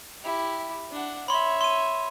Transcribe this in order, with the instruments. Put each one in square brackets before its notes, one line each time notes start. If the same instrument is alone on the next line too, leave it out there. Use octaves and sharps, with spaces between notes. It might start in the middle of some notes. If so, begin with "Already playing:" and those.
[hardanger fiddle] E4 G4
D4 F#5
[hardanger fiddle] C#5 E5 [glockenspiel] B5 C6
[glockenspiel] C6 D#7